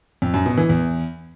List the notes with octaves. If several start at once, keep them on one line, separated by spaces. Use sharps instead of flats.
F2
F#2
B2
E3
E2